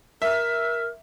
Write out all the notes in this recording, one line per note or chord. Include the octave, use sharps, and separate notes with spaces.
A#4 E5